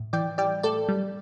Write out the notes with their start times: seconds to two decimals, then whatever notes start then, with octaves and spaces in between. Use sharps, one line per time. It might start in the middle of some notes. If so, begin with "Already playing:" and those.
Already playing: A2
0.13 E3 D5 G5
0.38 G3 D5 G5
0.63 A2 A4 D5
0.89 G3